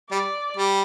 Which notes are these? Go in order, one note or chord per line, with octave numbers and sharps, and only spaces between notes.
G3 D5
G3